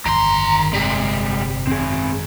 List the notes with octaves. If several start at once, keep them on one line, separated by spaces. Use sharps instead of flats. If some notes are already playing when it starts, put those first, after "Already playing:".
G1 F2 D#3 A#5 C6
C3 G3 G#3
G#1 F#2 B2 C4 G#4